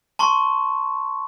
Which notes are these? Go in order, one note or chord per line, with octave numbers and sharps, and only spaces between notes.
A5 C6 C#6